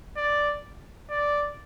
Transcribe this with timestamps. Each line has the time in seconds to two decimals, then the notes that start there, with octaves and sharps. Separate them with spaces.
0.17 D5
1.10 D5